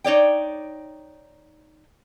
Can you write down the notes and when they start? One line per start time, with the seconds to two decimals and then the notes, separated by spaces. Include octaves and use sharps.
0.04 D#4 C#5 D5 G5